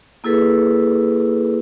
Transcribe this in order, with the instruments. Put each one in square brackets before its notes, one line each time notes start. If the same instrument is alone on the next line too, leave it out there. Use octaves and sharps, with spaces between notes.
[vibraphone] A#3 E4 G#4 A4 B4